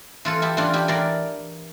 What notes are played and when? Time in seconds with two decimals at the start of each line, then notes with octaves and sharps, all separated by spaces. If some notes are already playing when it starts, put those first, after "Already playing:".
0.25 E3 F4 A4
0.42 E4 G4
0.57 E3 D4 F4
0.73 E4 G4
0.88 E3 A#4 D5